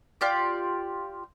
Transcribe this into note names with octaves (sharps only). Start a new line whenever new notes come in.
F4 G4 D5